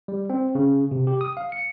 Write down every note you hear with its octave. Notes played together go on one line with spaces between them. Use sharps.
G3
C4
C#3
C3
G4
D#6
F5
C#7